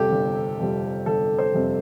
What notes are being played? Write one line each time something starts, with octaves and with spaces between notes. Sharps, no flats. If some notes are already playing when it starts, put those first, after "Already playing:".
Already playing: G1 F2 C3 G3 G4 A4
G1
F2 C3 G3
G1 A4
C5
F2 C3 G3